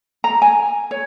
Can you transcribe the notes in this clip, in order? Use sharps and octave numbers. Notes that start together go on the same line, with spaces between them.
A#5
G#5
C#5